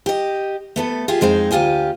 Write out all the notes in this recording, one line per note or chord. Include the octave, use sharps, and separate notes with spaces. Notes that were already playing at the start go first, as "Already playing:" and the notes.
G4 D#5
A3 B3 A4
F4 G4 G#4 E5
F2 G#3 C4 D#4
D2 G#2 F4 G4 G#5